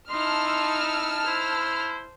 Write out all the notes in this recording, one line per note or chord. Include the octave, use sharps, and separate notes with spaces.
D#4 E4 A5 C6 E6 F6
E4 C5